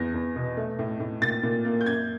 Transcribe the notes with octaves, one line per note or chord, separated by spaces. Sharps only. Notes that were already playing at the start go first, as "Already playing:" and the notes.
Already playing: E2 A#6
E2
B2
A3
A2
A2
A#2 A6
A#2
A#3
G6
F#2 G#6